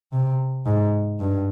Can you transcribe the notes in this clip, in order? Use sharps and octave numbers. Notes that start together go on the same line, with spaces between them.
C3
G#2
G2